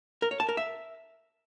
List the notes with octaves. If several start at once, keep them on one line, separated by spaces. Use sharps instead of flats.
A#4
C#5
A5
A#4
E5